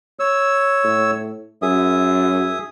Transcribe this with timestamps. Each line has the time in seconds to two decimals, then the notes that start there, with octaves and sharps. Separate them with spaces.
0.19 C#5 E6
0.84 A2
1.62 F#2 G#4 E5 D#6